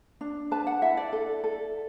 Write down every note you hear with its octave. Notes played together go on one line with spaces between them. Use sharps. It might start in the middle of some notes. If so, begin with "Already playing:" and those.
D4
B4 A5
F#5
E4 E5
D5
A4
A4